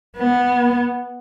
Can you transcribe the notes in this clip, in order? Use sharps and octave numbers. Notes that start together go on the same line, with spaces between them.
B3